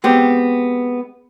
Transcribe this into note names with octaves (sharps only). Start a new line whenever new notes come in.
G#3 B3 C4 G4